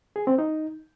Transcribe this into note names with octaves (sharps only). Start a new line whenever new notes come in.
G#4
C4
D#4